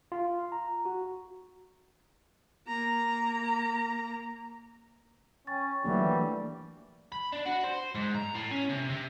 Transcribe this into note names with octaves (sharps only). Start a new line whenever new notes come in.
F4
A#5
F#4
A#3 A#5
C#4 G5 C#6 A6
E3 F#3 G3 A3 A#3 D4
B5
D4
F#4
C5
G#2
A#5
A2
C#4
C3
C3